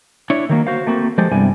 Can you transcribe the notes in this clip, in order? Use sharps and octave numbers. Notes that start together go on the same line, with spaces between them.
D4 E4 C#5
D#3 F#3 A#3
F#4 C5 F5
A3 A#3 C4 F#4
F3 G#3 G4 A4 C5
G2 C3 G3 B3 E4 G#5